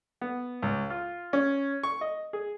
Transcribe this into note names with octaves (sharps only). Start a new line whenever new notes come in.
B3
C#2
F4
C#4
C#6
D#5
G#4